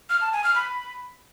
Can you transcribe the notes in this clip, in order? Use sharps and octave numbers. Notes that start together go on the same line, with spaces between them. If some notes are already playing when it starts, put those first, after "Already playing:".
F6
A5
G#5
F6
B5